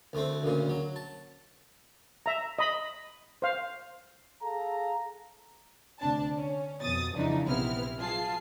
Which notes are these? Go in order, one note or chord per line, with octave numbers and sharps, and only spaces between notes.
D2 A3 C4
D2 A#2 C#3
F#3
A5
E5 A#5
D#5 B5
C5 F5
G#4 A4 F5 A#5
D2 C3 D4 A5
C#4
F2 B2 D#6 A6
F2 C#3 E3 F3 D4 D#4
A#1 C3 B3 E4 F6
F#3 F4 G#4 A5 C7